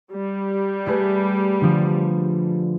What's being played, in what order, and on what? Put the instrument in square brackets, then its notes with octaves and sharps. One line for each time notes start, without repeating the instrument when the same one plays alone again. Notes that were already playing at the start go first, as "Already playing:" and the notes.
[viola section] G3
[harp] A3 G#4 B4
D3 F3